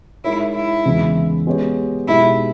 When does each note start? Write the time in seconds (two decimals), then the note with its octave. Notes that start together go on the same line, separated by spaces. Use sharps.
0.24 G#3 D#4 E4 A#4 C#5
0.55 E4
0.85 E2 C#3 G#3
1.47 G#3 B3 G4 C#5
2.08 B2 G#3 B3 D#4 E4 G4